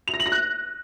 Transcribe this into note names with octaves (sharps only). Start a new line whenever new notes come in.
F7
A#6
F#7
A#6
F#6